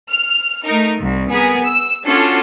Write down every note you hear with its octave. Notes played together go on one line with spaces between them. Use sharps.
F6
A3 D#4 A#4
C2
B3 G#4 A#4
E6
C#4 D4 F4 F#4 A4